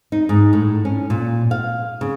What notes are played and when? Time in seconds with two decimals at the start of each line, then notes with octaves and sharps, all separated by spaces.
0.12 D#4
0.29 G#2
0.53 A2
0.85 C#4
1.10 A#2
1.51 F5
2.01 C#3